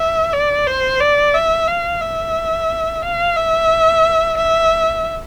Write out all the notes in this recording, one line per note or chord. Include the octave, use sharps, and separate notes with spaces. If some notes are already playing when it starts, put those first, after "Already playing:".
Already playing: E5
D5
C5
D5
E5
F5
E5
F5
E5
E5